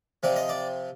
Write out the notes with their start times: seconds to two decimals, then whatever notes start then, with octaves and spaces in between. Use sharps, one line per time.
0.23 C3 F3 C4 D5
0.36 D#5
0.49 D5